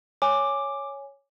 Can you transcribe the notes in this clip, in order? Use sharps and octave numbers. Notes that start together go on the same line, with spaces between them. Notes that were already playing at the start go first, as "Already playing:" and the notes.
C#5 G#5 D6